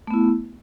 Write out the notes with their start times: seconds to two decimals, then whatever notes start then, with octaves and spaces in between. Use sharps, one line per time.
0.07 A3
0.11 B3
0.14 E4